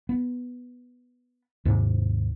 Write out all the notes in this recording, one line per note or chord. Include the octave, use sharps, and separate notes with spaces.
B3
D#2 G#2 C3